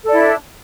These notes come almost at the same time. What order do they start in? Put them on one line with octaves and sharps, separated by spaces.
A4 D5 E4 D4